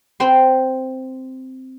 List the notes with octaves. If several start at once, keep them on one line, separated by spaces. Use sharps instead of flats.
C4 C5 G5 C6